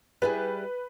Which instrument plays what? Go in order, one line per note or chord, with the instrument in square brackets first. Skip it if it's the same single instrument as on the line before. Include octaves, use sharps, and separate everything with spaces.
[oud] G3 E4 G#4 [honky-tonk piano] B4